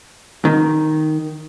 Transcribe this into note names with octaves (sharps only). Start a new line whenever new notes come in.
D#3